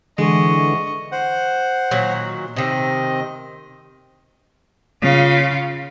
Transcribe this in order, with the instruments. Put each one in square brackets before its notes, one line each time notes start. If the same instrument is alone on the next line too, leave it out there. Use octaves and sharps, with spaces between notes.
[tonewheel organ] D3 [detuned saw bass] E3 [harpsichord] G#3 [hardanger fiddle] D#5 C#6
[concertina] C5 F#5
[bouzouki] A#2 D#3 F#3
[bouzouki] C3 D#3 [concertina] C4 D#5
[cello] C#3 F4